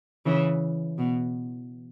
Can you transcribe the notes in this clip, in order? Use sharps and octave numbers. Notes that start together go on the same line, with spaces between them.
C#3 E3
B2